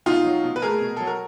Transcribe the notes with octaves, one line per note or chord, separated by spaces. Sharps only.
B2 D#4 F4
F#3
B2
B4
A3 G#4 A#4
B2
F#3 A4
A#4